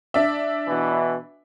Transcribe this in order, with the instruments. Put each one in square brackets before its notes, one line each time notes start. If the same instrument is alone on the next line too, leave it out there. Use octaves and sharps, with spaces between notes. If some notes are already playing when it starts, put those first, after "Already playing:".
[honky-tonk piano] D4 E5
[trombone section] B2 E3